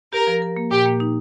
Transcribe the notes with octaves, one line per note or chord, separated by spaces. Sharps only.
G4 A#4
F3
A#4
A#3
A#2 G4
A#3
D#4